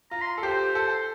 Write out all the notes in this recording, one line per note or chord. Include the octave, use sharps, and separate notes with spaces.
F4 A#5
C6
A4
G4 C5
A4